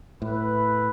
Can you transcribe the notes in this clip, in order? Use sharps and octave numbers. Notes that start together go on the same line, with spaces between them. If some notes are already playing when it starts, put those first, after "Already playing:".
A2 E4 B4